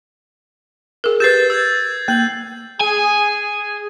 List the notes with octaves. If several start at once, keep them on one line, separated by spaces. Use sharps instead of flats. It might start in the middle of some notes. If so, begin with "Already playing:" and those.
G#4 A#4
G4 B4 G6 A6 C7
E6 G6 G#6
A#3 G6 F#7
G#4 G#5